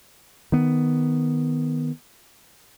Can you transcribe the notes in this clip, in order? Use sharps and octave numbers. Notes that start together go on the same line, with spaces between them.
D#3 B3